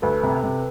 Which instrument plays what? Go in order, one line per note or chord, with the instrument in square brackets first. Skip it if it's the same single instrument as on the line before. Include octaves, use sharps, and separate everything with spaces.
[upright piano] D2 [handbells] A4 B4
[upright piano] C3
C3